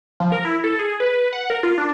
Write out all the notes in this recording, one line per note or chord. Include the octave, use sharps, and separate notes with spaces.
F3
A#4
E4
A4
G#4
B4
F#5
A#4
F4
D4